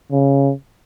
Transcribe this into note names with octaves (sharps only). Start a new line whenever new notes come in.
C#3